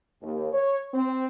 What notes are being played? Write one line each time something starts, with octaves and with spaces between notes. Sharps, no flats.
D#2
C#5
C4